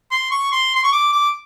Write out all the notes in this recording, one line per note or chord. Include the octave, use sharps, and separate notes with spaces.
C6
C#6
C6
C6
C#6
D6
D6